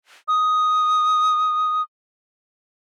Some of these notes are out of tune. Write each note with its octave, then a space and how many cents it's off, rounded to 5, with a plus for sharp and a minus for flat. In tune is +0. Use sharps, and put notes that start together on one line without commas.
D#6 +5